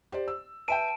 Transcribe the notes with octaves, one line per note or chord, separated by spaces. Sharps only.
G4 C5 D5
E6
B4 E5 G5 A5 D7 D#7